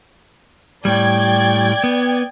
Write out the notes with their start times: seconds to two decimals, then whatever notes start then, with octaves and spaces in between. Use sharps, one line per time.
0.85 A2 G3 D5 G5 G#6
1.84 B3